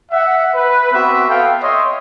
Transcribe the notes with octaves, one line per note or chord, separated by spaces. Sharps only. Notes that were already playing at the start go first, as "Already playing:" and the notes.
E5 F#5
B4
B3 C4 F#4 E5
B3 A4 F5 G5
C#5 D#5 E5 C6